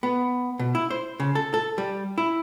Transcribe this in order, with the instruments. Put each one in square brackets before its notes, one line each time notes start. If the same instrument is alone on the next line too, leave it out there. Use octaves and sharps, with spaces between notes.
[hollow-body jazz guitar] B3
B2
E4
C5
C#3
A4
A4
G3
E4